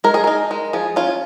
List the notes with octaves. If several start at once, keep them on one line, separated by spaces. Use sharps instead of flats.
G#3 A#4
G#4
D#4 A#4
G#3
F3 G#4
C#4 F4